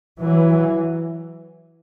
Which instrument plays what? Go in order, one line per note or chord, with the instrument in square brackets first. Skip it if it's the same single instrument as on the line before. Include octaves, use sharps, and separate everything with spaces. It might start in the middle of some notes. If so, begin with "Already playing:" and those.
[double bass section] E3 F#3